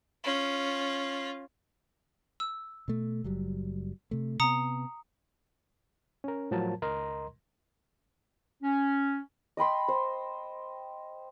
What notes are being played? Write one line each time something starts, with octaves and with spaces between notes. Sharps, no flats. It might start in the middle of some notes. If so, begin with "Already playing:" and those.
C#4 F4
E6
B2 A3
F#1 F#3 G3
C3 A3
C3 B3 A#5 D#6 C#7
C#4 A#4
A2 F3 F#3 A#4 A5
C#2 A#4 D#5 A#5 C6
C#4
D#5 G5 B5 C6
C5